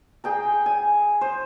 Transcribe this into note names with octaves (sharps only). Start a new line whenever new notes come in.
G#4 G5 A#5
G#5
C5